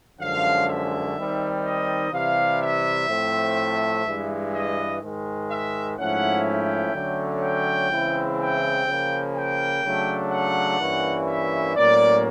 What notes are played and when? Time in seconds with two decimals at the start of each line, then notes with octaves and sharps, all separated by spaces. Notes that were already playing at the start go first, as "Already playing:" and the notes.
0.20 F#2 D3 F3 G#3 C#4 F5
0.68 E5
1.16 D#3 G3 C4 D#4
1.65 D#5
2.12 C3 E3 G3 F5
2.62 E5
3.09 A2 F3 A3 C4
4.05 G2 E3 G#3
4.53 D#5
5.02 G#2 D#3 G#3
5.49 E5
5.98 G#2 F3 A3 C#4 E4 F#5
6.46 G5
6.95 D3 F#3 A3 C#4
7.43 G5
7.91 C#3 E3 G#3 C4 E4
8.39 G5
8.87 C#3 F3 A#3
9.36 G5
9.84 C#3 F#3 A3 D4
10.32 F#5
10.80 G2 E3 G3 A#3 C#4
11.28 E5
11.76 A2 F#3 A#3 C#4 D5